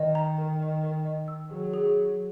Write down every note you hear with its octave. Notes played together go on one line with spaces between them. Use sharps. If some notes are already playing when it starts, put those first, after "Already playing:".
Already playing: D#3 D#5
A#5
A#4
D#5
A#4
D#5
E6
F#3 G#4
G#4